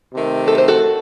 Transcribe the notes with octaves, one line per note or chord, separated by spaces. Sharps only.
C3 D#3 A3
A4
C5
F#4 A4